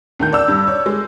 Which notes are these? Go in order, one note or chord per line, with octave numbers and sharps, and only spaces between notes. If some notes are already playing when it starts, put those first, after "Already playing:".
D2 D#3 G6
D5 E6
G2
C#5 D5
G#3